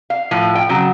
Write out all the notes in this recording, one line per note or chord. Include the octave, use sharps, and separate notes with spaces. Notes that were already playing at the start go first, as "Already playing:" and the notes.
F5
A2 F3
G5
C#3 F#3